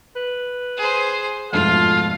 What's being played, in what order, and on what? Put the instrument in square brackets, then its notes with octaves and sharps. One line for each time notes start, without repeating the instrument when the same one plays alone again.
[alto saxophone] B4
[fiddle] G#4 C5
[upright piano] F2 G#2 B2 [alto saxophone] A3 [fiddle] F4 [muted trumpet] F5